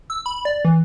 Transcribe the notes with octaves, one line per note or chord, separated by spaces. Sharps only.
E6
B5
D5
E3